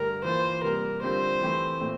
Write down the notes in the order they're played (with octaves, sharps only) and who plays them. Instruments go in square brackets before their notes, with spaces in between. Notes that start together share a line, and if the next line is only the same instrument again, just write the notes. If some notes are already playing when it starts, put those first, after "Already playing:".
Already playing: [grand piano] G2 D3 A3 D4 G4 [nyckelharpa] A#4
[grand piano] E3 A#3 F4 [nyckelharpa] C5
[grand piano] C3 G3 A#3 [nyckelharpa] A#4
[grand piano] D3 G3 C4 F4 [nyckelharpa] C5
[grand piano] E3 A3 C4 G4
A#2 A3 C4